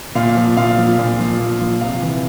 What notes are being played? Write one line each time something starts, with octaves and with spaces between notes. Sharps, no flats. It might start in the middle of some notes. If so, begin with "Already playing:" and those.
A#2 F5
F3
A#2 F5
F3
A#2
F3
A#2
F3
C3 F5
E3